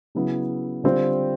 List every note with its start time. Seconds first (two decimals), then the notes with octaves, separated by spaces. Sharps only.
0.15 C#3 F#3 B3 E4
0.84 D3 G3 C4 F4